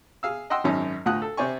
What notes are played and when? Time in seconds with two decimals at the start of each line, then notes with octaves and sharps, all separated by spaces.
0.23 G#4 F5 E6
0.50 D#5 F#5 G5 C6 E6
0.64 G#1 F#2 C#4 D#4
1.05 D2 A2 F4 F#5 D#6 F#6
1.22 A4
1.37 C3 C4 D5 G#5 C#6